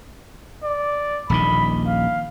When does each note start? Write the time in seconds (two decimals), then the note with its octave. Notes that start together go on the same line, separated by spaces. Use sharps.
0.64 D5
1.30 D#1 A#1 D#3 B5
1.87 F5